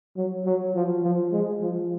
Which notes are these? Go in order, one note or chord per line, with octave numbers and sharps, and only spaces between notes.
F#3
F#3
F3
F3
G#3
F3